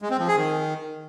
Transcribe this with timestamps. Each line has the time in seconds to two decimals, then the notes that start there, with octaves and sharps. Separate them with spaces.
0.02 G#3
0.11 C4
0.19 F3
0.28 G#4
0.36 D#3